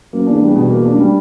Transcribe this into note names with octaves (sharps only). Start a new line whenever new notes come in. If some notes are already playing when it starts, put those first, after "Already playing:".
F#2 A#3
E2 D4
E2 G3
B2
A#3
D4
F#2
G3